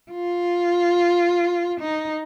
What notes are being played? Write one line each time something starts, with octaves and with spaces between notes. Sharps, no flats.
F4
D#4